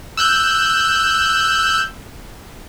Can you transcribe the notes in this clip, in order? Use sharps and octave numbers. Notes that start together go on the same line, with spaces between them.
E6 F#6 G6